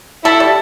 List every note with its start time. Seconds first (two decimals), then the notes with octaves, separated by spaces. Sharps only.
0.24 E4 A4 E5
0.40 G3